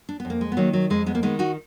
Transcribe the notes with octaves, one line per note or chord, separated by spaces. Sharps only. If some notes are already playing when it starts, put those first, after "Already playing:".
D4
B3
F2
A#3
G#3
B3
D#3 F#3 A#3
F#3
F2 G#3
G#3 B3
A#3
D#3 G#3 B3
D#4 F#4